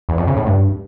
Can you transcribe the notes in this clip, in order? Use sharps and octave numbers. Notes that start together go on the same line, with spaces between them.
E2
F2
C#3
A2
G2